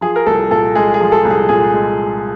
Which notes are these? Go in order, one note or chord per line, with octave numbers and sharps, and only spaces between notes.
F3 G#4
A#4
C2 A4
A#2 A4
G#3 G#4
G#4
F3
A4
C2
G#4
A#2 G#4
G#3